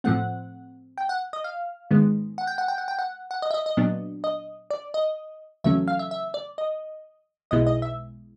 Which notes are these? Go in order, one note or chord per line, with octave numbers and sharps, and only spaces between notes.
A2 F3 A3 C4 F#5
G5
F#5
D#5
F5
G#2 D#3 G#3 B3
F#5
G5
F#5
G5
F#5
G5
F#5
F#5
D#5
E5
D#5
D#5
A#2 F#3 B3 D4
D#5
D5
D#5
E2 C#3 F#3 A3 C#4 E5
F5
E5
E5
D5
D#5
B1 B2 G#3 B3 E4 D#5
D#5
E5